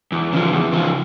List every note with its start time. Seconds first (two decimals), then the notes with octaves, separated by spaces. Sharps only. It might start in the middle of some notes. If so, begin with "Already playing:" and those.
0.12 E2
0.33 C#3 F3
0.53 E2
0.72 C#3 F3